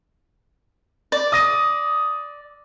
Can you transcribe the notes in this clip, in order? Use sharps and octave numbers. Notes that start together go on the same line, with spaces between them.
D5
D#6 A#6 D#7